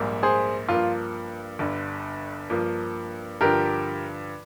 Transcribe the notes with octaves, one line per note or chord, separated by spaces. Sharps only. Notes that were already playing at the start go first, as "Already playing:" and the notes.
Already playing: A#1 G#2 G3 A#3
G#4 C5
G2 F3 A#3 F4
G1 G2 D3
G2 F3 A#3
G2 D3 F3 G4 A#4